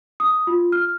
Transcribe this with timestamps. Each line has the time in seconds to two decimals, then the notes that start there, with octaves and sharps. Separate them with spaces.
0.20 D#6
0.47 F4
0.72 F6